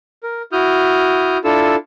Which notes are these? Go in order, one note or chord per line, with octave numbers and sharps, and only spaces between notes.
A#4
E4 F#4 D#6 F6 G6
D4 E4 F4 A4 E6